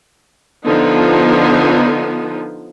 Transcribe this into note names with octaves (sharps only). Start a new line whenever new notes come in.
D3 F3 B3 D#4